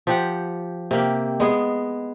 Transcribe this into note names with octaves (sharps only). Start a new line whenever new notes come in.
F3 G4 F#5
C3 A#3 G4
G#3 B3 G#4